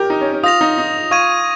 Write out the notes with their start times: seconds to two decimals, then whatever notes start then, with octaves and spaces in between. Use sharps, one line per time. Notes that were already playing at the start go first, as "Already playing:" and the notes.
Already playing: G4 A#4
0.10 D#4
0.21 C#4
0.33 C#4
0.43 F4 D#6 A#6 F7
0.61 D#4
0.78 D#4
1.11 F4 C#6 G#6 D#7